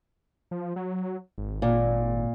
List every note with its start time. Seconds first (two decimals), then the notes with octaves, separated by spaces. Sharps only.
0.51 F3
0.76 F#3
1.38 G#1
1.62 A#2